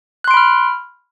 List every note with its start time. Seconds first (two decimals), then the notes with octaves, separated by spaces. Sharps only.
0.24 F#6
0.28 C6
0.31 D7
0.34 B5
0.37 F6